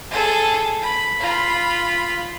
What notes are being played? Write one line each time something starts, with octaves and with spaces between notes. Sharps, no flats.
G#4 A4
B5
F4 B5